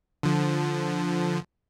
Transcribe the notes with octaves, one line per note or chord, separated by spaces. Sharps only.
D3 F3